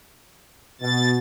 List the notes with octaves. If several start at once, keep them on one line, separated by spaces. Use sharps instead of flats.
B2 A6